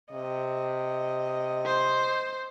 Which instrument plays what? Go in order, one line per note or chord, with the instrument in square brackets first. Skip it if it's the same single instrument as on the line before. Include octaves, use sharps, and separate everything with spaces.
[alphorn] C3 [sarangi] D#5
[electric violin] C5